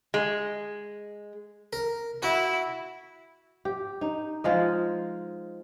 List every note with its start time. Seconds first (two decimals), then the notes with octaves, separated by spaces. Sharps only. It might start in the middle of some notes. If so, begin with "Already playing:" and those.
0.14 G#3
1.73 A#4
2.23 E4 F#4
3.65 G4
4.01 D#4
4.44 F3 G#3 D#5